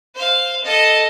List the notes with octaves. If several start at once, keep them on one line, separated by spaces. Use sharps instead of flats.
C5 F5
A4 D#5